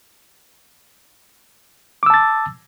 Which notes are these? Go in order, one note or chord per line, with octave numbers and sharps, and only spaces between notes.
A5 D6 E6 A6